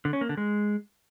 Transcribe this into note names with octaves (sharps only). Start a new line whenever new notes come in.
D3
C#4
A#3
D3
G#3